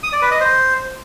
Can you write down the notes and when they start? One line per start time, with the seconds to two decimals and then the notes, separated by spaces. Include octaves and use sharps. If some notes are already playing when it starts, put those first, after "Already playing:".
0.03 D#6
0.12 D5
0.22 B4
0.31 D#5
0.40 C5